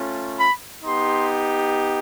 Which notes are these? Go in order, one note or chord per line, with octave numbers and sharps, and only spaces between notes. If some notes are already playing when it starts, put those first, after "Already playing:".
Already playing: A3 C#4 F4
B5
B3 D#4 G4 C6